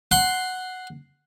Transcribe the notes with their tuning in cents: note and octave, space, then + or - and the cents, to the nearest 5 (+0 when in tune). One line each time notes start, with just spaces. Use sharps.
F#5 +0 C6 +0